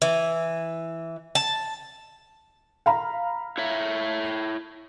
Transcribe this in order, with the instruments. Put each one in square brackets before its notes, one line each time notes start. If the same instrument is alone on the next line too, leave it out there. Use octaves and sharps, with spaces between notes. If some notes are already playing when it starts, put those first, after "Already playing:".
[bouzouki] E3
A5
[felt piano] F5 A#5 B5
[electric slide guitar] E4 C#5 E5